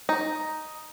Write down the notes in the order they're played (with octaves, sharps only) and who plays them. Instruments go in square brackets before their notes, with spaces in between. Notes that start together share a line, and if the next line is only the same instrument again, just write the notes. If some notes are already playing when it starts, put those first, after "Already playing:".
[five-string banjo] D#4